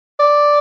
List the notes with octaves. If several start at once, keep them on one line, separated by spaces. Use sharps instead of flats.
D5